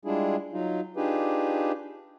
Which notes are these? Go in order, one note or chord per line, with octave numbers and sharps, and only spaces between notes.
G3 G#3 D4 E4 F4 G#4
F#3 D#4 F4
D4 D#4 F4 G4 G#4 B4